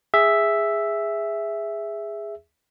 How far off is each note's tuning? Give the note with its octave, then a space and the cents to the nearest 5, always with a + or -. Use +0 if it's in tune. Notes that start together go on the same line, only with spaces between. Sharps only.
G#4 -10 E5 +0